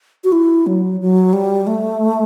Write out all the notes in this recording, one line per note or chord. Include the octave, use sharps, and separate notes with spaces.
F#4
E4
F#3
F#3
G3
A3